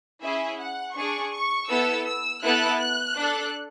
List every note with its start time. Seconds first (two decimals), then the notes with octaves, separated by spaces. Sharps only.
0.22 C#4 E4 G#4 E5
0.59 F#5
0.95 D4 G#4 C#6
1.32 C#6
1.69 B3 E4 A4 E6
2.06 E6
2.43 B3 E4 A4 F#6
2.78 F#6
3.15 D4 A4